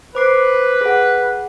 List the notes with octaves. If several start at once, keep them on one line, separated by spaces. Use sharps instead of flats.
B4 C5 D6 C7
G#4 F#5